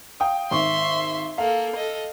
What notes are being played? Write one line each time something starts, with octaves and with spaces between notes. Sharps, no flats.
F5 G5 D#6
G#1 E5 C6 C#6
A#3 A4 F5
A4 D#5